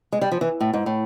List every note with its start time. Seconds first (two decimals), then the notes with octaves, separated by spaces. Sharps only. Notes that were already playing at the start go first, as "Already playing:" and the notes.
0.12 G#3
0.21 G3
0.32 F3
0.41 E3
0.61 A2
0.74 G#2
0.86 A2